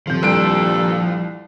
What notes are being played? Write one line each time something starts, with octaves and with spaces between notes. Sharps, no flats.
D#1 C3 F3 G6
C2 G2 A#2 A4 D7